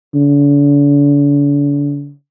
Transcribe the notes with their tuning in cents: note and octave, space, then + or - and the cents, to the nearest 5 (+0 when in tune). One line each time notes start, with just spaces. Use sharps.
D3 -40